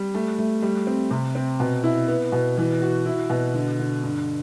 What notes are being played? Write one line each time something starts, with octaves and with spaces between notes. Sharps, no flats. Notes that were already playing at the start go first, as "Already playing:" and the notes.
Already playing: G3
A3
A3
G3
C4
C3
C4
B2
E4
B3
B2
E3
F#4
E4
B2
D3
D3
G2